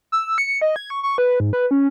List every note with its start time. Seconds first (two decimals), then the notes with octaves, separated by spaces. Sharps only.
0.12 E6
0.38 C#7
0.62 D#5
0.76 G#6
0.90 C#6
1.03 C#6
1.18 B4
1.40 G#2
1.53 B4
1.71 C#4